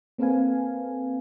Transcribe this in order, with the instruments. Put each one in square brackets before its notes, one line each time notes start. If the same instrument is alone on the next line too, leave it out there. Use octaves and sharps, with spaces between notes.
[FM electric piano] A#3 C4 A4 B4 F5 G#5